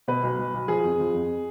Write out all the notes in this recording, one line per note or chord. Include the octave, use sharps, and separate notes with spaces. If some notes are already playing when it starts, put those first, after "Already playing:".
B2 B4
B1
B1
B1
F3 G#4
F2
F3
F2